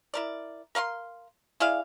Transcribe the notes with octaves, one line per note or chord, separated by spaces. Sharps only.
E4 A#4 D5
A#4 F5 B5 C6
E4 G#4 D5 F5